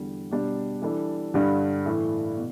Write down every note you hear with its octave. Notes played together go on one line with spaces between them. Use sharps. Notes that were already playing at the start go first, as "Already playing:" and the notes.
Already playing: E2 D3 G3
B2 G3 D4 G4
E3 G3 D4 A4
G2 D3 G3 D4 G4
A2 E3 A3
B2